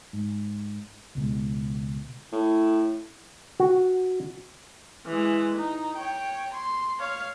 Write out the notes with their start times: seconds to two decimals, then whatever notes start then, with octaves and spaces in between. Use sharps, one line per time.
0.13 G#2
1.15 C#2 B2 G#3
2.32 A2
3.60 F#4
5.06 E3 G#3
5.56 D#4
5.97 C#5 G5
6.53 C6
6.99 C#5 F5